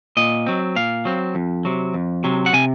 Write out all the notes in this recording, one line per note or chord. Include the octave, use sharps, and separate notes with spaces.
A#2 D#5
F#3 C4
A#2 F5
F#3 C4
F2
C3 F#3
F2
C3 F#3
F#5
C3 G#5